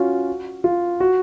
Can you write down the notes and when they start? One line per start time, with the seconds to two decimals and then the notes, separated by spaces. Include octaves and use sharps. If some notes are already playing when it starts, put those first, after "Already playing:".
Already playing: C#4 F4 F#4
0.64 F4
1.00 F#4